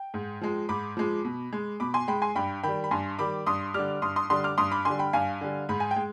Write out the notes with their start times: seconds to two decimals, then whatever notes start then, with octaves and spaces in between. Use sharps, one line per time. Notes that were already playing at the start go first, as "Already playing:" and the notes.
Already playing: G5
0.14 G#2
0.41 F3 G#3
0.69 G#2 B5 D6
0.97 F3 G#3
1.25 B2
1.52 G#3
1.80 B2 B5 D6
1.94 G#5 C6
2.08 G#3 G5 B5
2.22 G#5 C6
2.36 G2 G5 B5
2.63 D#3 G3 G5 B5
2.84 B5
2.91 G2 G#5 C6
3.19 D#3 G3 B5 D6
3.46 G2 C6 D#6
3.74 D3 G3 D6 F6
4.02 G2 C6 D#6
4.16 C6 D#6
4.30 D3 G3 C6 D#6
4.44 D6 F6
4.58 G2 C6 D#6
4.71 B5 D6
4.85 D3 G3 G#5 C6
4.99 G5 B5
5.13 G2 F5 G#5
5.41 D3 G3
5.69 G#2 B5
5.80 G#5
5.91 G5
5.96 G#3